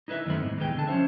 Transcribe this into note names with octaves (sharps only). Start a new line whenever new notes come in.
D#4 E4 B4 D#5 E5
F#2 D#3 A3 B3 C4 B5
C2 G#2
D#2 B2 E3 G#3 B4 G5
D2 D3 A5
F3 C#4 C5 E5